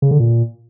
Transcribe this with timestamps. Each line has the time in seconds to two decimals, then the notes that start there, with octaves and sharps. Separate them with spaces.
0.02 C#3
0.11 D3
0.20 A#2